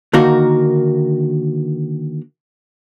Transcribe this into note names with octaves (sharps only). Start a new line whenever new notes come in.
D3 D#3 A#3 D#4 F#4 A#4